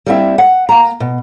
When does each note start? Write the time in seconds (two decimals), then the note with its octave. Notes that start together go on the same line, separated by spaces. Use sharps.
0.06 G3 A#3 C4 D4 E4 E5
0.38 F#5
0.69 A#3 A#5
1.00 B2